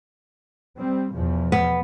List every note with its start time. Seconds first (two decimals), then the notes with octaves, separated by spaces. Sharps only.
0.78 G3 C4
1.15 E2 B2 F3
1.52 B3